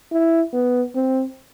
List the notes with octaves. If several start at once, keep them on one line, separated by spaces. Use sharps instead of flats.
E4
B3
C4